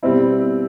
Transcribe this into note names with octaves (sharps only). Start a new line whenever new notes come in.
B2 G3 C4 E4